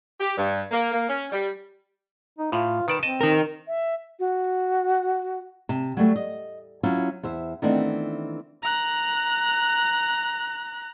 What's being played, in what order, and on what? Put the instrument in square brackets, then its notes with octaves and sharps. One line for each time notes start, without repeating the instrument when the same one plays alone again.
[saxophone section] G4
G2
A#3
A#3
C#4
G3
[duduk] D#4
[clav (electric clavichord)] A2 [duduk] F4
[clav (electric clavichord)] D#3 D5 A5 [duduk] B4
[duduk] C4 [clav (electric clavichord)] D#5 A5
[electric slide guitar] D#4 A#4
[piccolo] E5
[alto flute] F#4
[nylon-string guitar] C3 A5
F#3 G3 A3
D#5
F#3 C#4 E4 F4
E2 C5 E5
D#3 E3 A3 B3 C4 D4
[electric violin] A#5 F#6